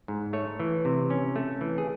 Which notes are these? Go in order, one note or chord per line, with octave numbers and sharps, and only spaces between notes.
G#2
A3 C#5
E3
C3
C#4
A3
E3
G#4